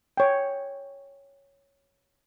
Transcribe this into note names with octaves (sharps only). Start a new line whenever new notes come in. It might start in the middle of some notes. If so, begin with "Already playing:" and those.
C#5 G5